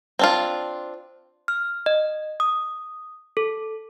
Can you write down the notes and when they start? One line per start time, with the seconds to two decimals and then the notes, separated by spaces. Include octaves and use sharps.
0.19 C4 D4 F4
1.48 F6
1.86 D#5
2.40 D#6
3.37 A4